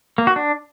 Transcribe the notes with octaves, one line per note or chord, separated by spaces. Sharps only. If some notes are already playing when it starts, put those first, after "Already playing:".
A#3
F#4
D4